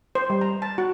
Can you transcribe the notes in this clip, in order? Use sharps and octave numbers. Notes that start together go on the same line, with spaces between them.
C5
G3
A#5
A5
F#4